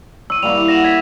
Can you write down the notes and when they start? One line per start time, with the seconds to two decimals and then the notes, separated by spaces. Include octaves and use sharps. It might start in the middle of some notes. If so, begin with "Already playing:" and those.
0.30 C#6 E6 D#7
0.43 G3 A#3 E4 F7
0.68 F#5 A#6 E7 F#7
0.84 E5 G#6 B6